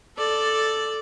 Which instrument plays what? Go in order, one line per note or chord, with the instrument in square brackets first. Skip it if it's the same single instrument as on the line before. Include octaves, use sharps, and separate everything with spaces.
[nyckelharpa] A4 D5